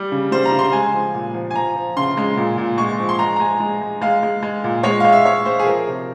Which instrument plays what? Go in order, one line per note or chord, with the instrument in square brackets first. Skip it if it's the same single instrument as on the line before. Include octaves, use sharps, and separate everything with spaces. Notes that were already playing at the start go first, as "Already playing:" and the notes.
Already playing: [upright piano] G3
C#3
G3 C5
A#5
C#3
C6
G#3 G#5
F3
A#2
F3
G#5
F3 A#5
F3
C#3 C6
G#3
A#2
A#2
G#3 C#6
F3
C6
G#3 A#5
A#5
G#3 G#5
G#3
G#3
G#3 F5
G#3
G#3
A#2
G#3 C#5
G#3 F5
E5
G#3 C#5
G#3 C5
G#4
F3 A#4
C3